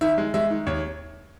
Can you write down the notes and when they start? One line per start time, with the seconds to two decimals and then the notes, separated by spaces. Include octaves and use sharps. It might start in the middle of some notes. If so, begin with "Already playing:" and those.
0.01 D#3 E5
0.18 G#3
0.34 G#3 E5
0.50 D#3
0.66 D#2 C#5